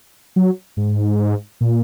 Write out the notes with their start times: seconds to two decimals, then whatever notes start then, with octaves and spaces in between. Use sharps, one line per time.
0.36 F#3
0.77 G#2
1.61 A#2